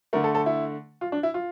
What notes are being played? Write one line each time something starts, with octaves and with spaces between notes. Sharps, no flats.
D3 A3 A#4
A4
A4
E4
F4
D4
E4
F4